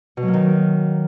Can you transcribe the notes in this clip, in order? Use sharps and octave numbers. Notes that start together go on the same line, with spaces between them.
B2
F#3
A#3
D#3